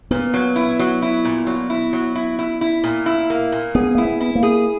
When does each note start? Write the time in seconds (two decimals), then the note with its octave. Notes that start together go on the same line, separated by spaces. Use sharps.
0.11 A#2 B3
0.34 F#3
0.56 E4
0.79 F#3
1.02 E4
1.25 A#2
1.47 F#3
1.70 E4
1.93 F#3
2.15 E4
2.39 E4
2.61 E4
2.84 A#2
3.06 E4
3.30 A#3
3.52 A#2
3.75 B3 G#4
3.95 A#3 E4
4.05 B3
4.21 E4
4.35 A#3
4.43 G#4